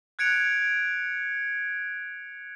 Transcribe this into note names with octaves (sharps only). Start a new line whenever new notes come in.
F#6 G#6 C#7 D7 F7